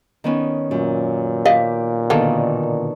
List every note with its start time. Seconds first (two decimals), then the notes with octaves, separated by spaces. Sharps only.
0.24 D#3 B3 C#4
0.71 F#2 A#2
1.46 G4 D5 D#5 F5
2.10 B2 D3 D#3 A#3 F4 A4